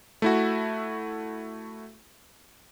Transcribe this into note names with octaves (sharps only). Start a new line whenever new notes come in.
A3 E4 F#4